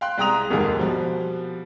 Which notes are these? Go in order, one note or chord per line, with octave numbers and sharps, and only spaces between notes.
F5 G5 C6 F#6
C2 G#3 G5 A#5 D#6 F7
F1 D#2 G#2 G#4 A#4
B2 F3 G3